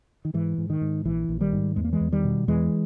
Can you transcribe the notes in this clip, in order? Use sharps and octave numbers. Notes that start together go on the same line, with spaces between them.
D#3
G#2 E3
G#2
D#3
G#2
A#1 E3
A#1
D#3 G3
G#2
E2 G#3
A#3
E3 G#3
E2
D#3 G3
B2
E2 E3 G#3